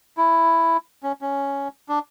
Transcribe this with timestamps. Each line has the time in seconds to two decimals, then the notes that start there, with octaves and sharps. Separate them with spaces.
0.17 E4
1.03 C#4
1.21 C#4
1.89 D4